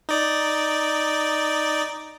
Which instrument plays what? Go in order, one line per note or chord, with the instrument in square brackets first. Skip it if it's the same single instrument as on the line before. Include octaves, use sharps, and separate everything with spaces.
[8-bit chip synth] D#4 D5